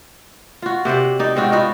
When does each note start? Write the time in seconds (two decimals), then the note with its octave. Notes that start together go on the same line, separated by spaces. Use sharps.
0.62 F4 F#4
0.85 C3 C5 D5 F#5
1.19 D#4 D5
1.36 G#2 C4 F4 F#4
1.52 B3 D#4 F4 F#4